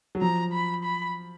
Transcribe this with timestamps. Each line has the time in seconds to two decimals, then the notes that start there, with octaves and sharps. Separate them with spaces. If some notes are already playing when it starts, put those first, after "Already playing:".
0.15 F#3
0.21 F3 A#5
0.52 B5
0.84 B5